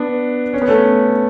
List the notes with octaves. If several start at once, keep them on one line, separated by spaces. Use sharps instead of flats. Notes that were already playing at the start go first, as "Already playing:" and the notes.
Already playing: B3 D4
C#4
B3
A3 C#4